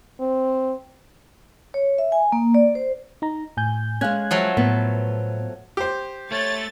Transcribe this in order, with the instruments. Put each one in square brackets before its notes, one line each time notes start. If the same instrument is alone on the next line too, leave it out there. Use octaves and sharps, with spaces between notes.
[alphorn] C4
[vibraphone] C#5
E5
G#5
A#3
D5
C5
[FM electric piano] D#4 A#5
A2 G#5 G6
[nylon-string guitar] G#3 C#4 [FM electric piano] F5 F#6 G#6
[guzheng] F3 F#3 A3
[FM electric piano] A2 [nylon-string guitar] B3
[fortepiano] G4 C5
[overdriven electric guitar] A3 [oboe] C#5 [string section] A6